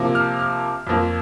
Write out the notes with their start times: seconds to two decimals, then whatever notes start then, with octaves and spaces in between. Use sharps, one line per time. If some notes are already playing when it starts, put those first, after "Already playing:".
Already playing: C3 F3 A#3
0.15 F6
0.39 F6
0.87 F2 F3 A#3